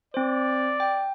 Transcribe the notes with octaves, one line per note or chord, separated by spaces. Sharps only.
C4 C5 D5
G5